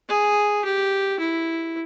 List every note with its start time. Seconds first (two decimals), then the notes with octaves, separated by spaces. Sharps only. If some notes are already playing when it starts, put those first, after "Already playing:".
0.09 G#4
0.64 G4
1.19 E4